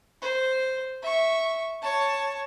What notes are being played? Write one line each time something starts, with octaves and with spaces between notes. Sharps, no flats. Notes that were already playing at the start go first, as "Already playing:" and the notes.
C5
E5 C#6
C#5 A5